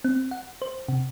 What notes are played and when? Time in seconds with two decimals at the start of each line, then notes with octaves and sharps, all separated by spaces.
0.04 C4
0.31 F#5
0.62 C5
0.88 C3